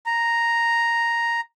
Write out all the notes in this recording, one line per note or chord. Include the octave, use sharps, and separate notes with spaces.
A#5